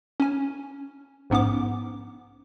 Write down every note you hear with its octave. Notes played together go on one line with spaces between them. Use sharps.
C#4 G#5
A#1 G#2 B3 C#4 D6